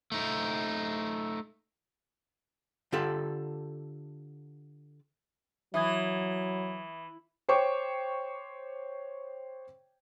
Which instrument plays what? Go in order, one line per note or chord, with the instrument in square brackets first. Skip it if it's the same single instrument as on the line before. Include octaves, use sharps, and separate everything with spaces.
[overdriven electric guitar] A3 D#4
[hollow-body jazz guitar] D3 F4 G4 A4
[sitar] E3 [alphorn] F#3 [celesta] E5 D#6 G#6
[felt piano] C5 C#5 G5 C#6 D6